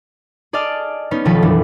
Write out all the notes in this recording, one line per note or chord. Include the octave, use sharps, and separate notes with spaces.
G#4 D5 D#5 A5 F6
B3 C#4 D#4
B1 D#3 F3 A4 B4
F#1 E3 D4